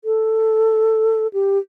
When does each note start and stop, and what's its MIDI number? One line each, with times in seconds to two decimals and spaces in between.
0.04 1.27 69
1.33 1.58 67